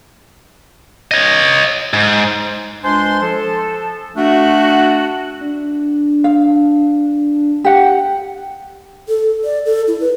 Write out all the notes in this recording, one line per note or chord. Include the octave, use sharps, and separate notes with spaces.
C#5 D#5
G#2
C#2 G#3 D4 C5 G#5 C6
F3 A4
A3 D4 F#4
D4
F5
G4 F#5
A4
D5
A4
E4
B4